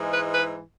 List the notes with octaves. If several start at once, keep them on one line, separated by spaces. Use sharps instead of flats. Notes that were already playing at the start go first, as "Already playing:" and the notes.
Already playing: G#2 E3 G#3
B4
B4